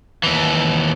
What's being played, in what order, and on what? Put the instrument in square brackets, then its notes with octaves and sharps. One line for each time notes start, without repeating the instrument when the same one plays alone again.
[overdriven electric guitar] D#2 E3